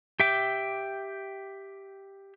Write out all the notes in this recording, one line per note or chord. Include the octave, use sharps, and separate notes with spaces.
G4 E5 G5 D6